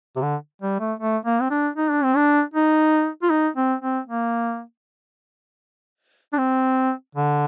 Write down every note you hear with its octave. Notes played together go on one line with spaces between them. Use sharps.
C3
D3
G3
A3
A3
A#3
C4
D4
D#4
D4
C4
D4
D#4
F4
D#4
C4
C4
A#3
D4
C4
D3